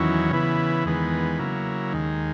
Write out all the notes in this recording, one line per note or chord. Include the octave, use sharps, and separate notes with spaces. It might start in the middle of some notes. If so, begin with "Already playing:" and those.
Already playing: E2 D#3 F#3 C#4 E4
C#3 E3 B3 E4
E2 D#3 G#3 B3
C#3 F#3 A#3 E4
D#2 D#3 G#3